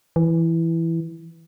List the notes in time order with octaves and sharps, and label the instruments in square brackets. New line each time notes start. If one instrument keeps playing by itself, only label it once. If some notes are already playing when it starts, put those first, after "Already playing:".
[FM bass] E3